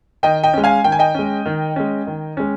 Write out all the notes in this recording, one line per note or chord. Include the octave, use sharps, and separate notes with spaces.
D#3 D#5 G5
D#5 G5
G#3 C#4
F5 G#5
D#3 G5
G#5
D#5 G5
G#3 C#4
D#3
G#3 C#4
D#3
G#3 C#4